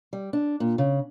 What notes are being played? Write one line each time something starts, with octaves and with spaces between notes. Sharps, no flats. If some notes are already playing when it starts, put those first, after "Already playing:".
G3
D4
A#2
C#3